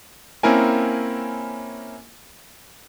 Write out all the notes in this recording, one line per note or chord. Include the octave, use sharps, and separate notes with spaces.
A#3 C4 C#4 E4 A#4 G#5